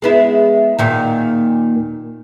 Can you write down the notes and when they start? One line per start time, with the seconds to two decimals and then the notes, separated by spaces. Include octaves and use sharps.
0.02 G#3 B3 E4
0.79 D#2 A#2 D#3